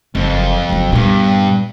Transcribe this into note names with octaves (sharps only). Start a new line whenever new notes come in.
F#1 F2
F#1 F#3
G2 A#2 B3